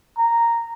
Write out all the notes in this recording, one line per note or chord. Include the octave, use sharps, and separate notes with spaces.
A#5